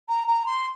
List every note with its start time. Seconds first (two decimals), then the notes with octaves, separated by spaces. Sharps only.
0.08 A#5
0.27 A#5
0.46 C6